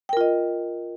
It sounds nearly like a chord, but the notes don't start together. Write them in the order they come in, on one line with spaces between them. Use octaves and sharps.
G5 A#4 F4 D#5